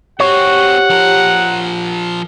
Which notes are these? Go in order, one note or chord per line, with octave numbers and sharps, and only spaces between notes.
C4 F#4 G4 C#5 F#5
F3 A#4